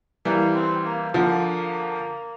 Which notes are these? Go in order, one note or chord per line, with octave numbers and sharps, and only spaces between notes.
E3 G3 A#3
C4
A#3
D3 F3 A#3